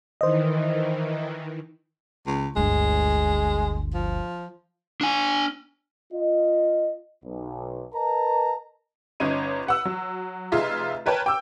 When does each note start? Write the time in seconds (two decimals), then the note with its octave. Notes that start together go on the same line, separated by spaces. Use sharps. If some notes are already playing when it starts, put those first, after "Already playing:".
0.21 D#3 E3 C5 D#5
2.27 C#2
2.56 G1 D2 G#3
3.94 F3
5.01 D4 G#5
6.13 F4 D#5
7.23 B1
7.94 A#4 B4 D#5 A5 A#5
9.20 G1 C#4 D#4 C#5 D#7
9.67 B4 F#5 E6
9.85 F#3
10.52 F1 D#4 F4 G#4 E5
11.06 A#4 B4 C#5 G5 A5
11.26 G5 D6 E6